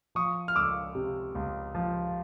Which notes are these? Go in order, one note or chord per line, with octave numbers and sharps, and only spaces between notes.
F3 C#6 D#6
F6
C#2 D6 E6
C3
C#2
F3